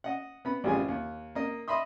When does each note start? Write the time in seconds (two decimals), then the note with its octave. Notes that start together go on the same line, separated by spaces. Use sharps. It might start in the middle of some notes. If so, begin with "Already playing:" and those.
0.04 D#5 F#5
0.45 B3 B5
0.64 A1 F#2 G3 F4 G#4 G#5
0.88 D#2
1.35 A#3 D#5
1.68 D#5 E5 B5 C6 D#6